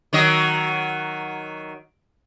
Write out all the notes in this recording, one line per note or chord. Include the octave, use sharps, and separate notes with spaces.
D#3 F#3 D#5